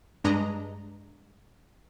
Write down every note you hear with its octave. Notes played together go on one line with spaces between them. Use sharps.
G2 G#3 D4 B4 D#5 A#5